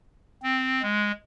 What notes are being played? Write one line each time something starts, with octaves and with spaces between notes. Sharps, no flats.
C4
G#3